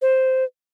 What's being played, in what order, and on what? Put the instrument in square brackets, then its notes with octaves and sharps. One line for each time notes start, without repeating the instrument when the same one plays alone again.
[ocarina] C5